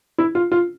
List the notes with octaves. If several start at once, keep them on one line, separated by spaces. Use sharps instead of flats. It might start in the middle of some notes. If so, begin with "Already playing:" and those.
E4
F4
F4